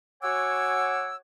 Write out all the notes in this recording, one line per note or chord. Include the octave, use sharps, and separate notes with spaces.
F#4 C#5 F#5 G#5 D6 E6